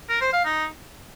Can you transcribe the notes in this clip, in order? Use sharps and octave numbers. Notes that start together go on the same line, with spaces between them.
A#4
C5
F5
D#4